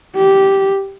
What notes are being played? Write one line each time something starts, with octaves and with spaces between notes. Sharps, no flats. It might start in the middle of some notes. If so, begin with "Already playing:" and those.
G4